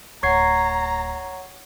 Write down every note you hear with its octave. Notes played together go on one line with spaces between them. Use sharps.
D1 C#5 F#5 A#5 C#6 G#6 C7